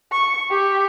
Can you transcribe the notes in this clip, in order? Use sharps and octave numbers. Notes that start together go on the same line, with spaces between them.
C#6
G4